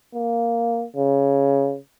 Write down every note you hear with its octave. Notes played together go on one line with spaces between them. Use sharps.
A#3
C#3